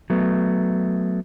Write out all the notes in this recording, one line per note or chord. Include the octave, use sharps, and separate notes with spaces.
F#3 A3 B3